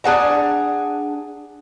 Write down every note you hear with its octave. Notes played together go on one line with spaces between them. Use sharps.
D4 G#4 F#5 A#5